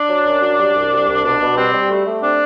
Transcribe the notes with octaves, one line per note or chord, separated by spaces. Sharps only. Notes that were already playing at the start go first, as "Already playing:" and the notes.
Already playing: D4
F#3
F#2
F#3
G3
C2
G3
C2
B2 D4
B2
G3 C4
G3
A3
A3
C4 D4